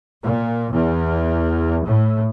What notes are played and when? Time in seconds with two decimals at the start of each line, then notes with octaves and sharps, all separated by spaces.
0.21 A#2
0.71 E2
1.84 A2